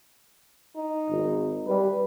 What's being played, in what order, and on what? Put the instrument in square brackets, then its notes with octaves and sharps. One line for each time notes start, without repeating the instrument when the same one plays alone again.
[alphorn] D#4
[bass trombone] G#1
[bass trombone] G3 [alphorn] B4